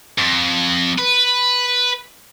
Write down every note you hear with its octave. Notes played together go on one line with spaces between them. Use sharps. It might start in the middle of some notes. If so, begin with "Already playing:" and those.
F2
B4